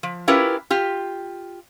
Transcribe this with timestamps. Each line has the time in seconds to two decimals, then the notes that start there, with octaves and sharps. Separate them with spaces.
0.03 F3
0.28 C#4 E4 F4 G4 A#4 B4
0.70 F4 G4